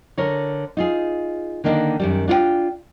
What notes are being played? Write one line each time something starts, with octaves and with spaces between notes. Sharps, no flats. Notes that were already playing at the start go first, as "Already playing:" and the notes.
D3 A#4 C#5
D#4 F4 G#4
D3 D#3 A#3 D4 D#4
F#2 D#3 G3
D4 F4 C#5 G5